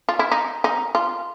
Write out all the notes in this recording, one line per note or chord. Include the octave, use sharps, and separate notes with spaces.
F4
E4
D#4
D#4
F4